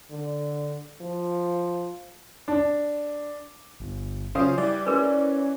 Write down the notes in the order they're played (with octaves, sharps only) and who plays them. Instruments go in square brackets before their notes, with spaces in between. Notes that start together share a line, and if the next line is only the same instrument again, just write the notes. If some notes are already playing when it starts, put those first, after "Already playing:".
[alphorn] D3
F3
[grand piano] D4
[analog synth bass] G1
[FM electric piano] C#3 F#3 F4 [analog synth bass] C#4 [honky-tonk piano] C5 F5 D#6
[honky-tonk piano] E3 [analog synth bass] G3 [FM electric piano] D5
[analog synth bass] C#4 [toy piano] G#4 A#4 B4